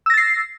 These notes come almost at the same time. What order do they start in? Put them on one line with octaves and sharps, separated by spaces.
E6 A#6 A6 C7